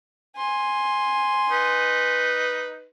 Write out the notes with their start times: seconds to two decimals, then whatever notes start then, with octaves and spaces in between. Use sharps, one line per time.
0.38 G#5 C6
1.50 D#4 B4